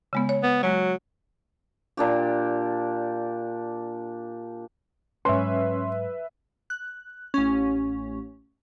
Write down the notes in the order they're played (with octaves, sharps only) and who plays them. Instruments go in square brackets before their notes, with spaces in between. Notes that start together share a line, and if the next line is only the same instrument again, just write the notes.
[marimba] C#3 G#3 B3
C#5
[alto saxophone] B3
[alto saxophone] F#3 [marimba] G#3 F#4
[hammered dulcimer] A#2 D4 G4
[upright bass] G#2 F#3 [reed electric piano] C#4 [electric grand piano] B4 E5 [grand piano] C6
[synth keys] F#6
A1 C#4